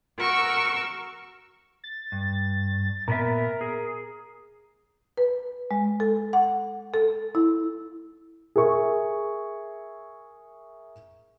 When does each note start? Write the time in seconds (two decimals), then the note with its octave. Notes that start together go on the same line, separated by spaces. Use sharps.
0.17 F#4 A#4 C#6 E6
1.84 A6
2.12 G2
3.08 A#2 B3 A#4 E5
3.61 G#4
5.17 B4
5.71 G#3
6.00 A4
6.33 F#5
6.94 A4
7.35 E4
8.56 G#4 A#4 E5 C#6